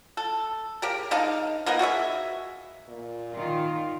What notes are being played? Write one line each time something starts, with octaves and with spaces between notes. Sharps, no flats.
A4
C#3 G4 A#4
G#3 D4 D#4 F5
A#3 B3 D#4 A#4
F#4 G#4 D5 E5
A#2
D#3 F4